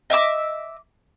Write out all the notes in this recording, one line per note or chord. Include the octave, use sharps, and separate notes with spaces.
D#5 E5 D6 E6